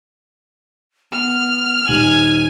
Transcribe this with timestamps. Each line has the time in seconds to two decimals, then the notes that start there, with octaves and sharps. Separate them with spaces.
1.13 B3 F6
1.88 D#1 D#4 G4 G#5 F#7